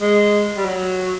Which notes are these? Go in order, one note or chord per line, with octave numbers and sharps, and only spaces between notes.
G#3
G3
F#3